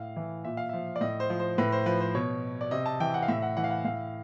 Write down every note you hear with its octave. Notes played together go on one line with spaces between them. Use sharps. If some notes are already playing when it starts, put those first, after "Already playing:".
Already playing: A2 F5
E3
A#2 E5
F5
F3 E5
D5
A2 D#5
C5
F3
C5
A2 B4
C5
F3 B4
C5
B2 C#5
D5
C3 D#5
A5
E3 G5
F#5
F5
A2 E5
F#5
E3 F#5
F5
F#5
A2 F5